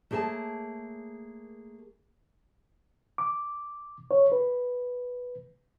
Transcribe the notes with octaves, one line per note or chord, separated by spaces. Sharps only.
A3 A#3 G#4 C#5 A5
D6
C#5
B4